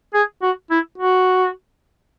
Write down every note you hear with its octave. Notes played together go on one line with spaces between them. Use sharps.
G#4
F#4
E4
F#4